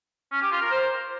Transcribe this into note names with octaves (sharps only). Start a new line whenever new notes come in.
C#4
G4
F4
A#4
C5